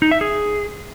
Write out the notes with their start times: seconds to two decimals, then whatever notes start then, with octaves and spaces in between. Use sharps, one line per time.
0.02 D#4
0.11 E5
0.21 G#4